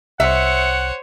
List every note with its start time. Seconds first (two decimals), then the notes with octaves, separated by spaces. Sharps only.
0.20 C2 C5 C#5 E5 F#5